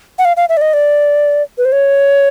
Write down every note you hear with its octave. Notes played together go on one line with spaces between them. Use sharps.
F#5
F5
F5
E5
D5
D#5
D5
B4
C5
C#5